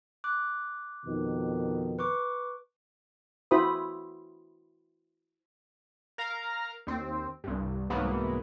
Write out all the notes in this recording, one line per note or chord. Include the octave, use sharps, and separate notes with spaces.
D6 F#6
F2 B2 D#3
B4 C#6 D6
E4 F#4 C5 B5 D#6
A#4 F5 A#5
D#2 C4
C2 G2
C2 G#2 E3 F#3 A#3 B3